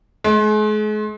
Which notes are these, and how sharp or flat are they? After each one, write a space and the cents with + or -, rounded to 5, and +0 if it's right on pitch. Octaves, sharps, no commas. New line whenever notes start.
G#3 +40